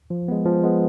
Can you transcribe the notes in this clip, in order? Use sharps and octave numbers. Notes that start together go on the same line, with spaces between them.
F3
G#3 B3
F3
G#3 B3